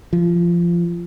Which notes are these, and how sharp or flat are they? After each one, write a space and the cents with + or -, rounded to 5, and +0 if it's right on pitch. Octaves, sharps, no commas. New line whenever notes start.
F3 -20